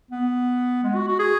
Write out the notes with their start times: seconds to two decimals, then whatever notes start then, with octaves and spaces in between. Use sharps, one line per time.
0.11 B3
0.83 G#3
0.95 F#4
1.07 F#4
1.19 G#4